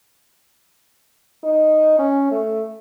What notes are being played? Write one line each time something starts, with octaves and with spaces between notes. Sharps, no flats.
D#4
C#4
A3